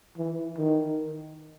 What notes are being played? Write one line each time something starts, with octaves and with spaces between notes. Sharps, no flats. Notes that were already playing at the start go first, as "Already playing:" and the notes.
E3
D#3